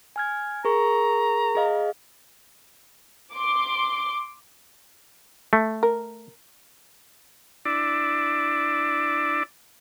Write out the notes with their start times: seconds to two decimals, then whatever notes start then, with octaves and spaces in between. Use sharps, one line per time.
0.16 G#5 F6 G#6
0.65 G#4 A#4 A#5 C#6
1.55 G#4 D#5 F5
3.33 C6 D6
5.53 A3
5.83 A#4
7.65 D4 E4 D5